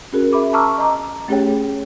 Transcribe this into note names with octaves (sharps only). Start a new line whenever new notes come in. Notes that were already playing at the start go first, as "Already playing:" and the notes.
C#4 F#4 G#4 A#4
E5 B5 D6
A5 A#5 C#6 D6 E6 F6
D#5 A#5 D6
A3 C#4 G4 G#4 C#5 G5